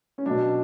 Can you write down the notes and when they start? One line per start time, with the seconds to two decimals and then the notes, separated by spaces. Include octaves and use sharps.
0.18 C#4
0.26 B2 F#3 D4